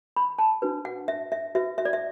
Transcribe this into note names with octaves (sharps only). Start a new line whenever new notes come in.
B5
A5
D4 F#4 B4
F#5
E5
E5
F#4 B4 E5
E5
D5
E5